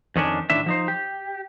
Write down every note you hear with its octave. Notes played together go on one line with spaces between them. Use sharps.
F2 D#3 C#4 D4
A2 D#3 D4 E5
F3 D#4 C5
G4